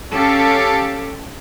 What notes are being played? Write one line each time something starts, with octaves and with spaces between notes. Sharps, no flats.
C#4 G4 A4 F5